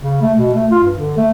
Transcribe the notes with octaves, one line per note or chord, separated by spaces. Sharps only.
C#3
A3
B2
A3
F4
G2
D3
A3